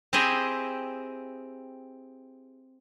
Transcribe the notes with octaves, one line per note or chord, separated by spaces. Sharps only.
C4 E4 G4 G#4 D#5